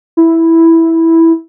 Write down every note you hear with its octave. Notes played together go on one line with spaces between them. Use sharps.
E4